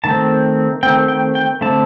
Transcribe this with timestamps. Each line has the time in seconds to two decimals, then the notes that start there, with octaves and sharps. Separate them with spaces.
0.04 D#3 A3 C4 A5
0.83 D#3 A3 C4 G5
1.08 G5
1.35 G5
1.61 D3 A3 C4 A5